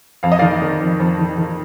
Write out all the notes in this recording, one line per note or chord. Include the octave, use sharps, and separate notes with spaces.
F2 F5
D#5
D#3 D5 F5
D#3
F2
F2
D#3
D#3